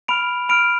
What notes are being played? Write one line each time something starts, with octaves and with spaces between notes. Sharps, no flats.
B5 F6 D7 F7
B5 F6 D7 F7